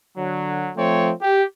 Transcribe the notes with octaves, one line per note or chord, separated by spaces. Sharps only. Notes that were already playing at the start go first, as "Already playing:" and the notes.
D3 F#3
F3 A3 C4 C#5
G4